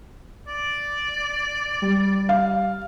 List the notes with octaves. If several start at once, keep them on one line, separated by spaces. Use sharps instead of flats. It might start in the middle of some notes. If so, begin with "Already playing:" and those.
D5
G3
F5